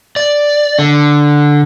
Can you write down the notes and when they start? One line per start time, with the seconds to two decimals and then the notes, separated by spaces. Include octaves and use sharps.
0.16 D5
0.79 D3